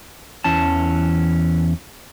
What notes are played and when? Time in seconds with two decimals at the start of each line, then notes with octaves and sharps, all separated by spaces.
0.44 E2 E3 C#4 A5